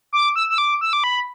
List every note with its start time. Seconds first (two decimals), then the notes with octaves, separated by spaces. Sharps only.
0.13 D6
0.36 E6
0.50 E6
0.58 D6
0.81 E6
0.93 D6
1.04 B5